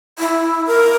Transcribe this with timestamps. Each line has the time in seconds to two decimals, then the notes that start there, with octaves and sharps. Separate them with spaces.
0.19 E4
0.67 A#4